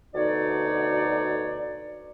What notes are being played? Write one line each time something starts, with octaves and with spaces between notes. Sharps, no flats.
D2 B2 D3 D#4 C#5 D5